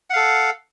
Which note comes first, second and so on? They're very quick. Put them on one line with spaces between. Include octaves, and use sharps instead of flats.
F#5 F5 A4